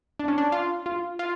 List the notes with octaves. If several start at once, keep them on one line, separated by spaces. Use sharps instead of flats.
D4
C#4
D4
F4
F4
F4